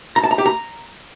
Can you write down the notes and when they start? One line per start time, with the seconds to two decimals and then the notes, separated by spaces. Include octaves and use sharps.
0.16 A#5
0.23 A5
0.31 A#5
0.38 G4
0.46 A#5